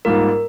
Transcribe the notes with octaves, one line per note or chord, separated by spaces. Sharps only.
G#2 G3 A#3 F4 A#4